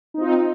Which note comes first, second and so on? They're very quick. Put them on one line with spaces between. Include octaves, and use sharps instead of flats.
D#4 C4 F4